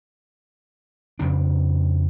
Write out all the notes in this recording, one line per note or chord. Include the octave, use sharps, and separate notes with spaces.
F2 C#3 D4